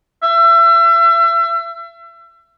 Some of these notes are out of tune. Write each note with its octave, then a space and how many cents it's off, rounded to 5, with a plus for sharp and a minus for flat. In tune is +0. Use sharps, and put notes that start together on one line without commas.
E5 +35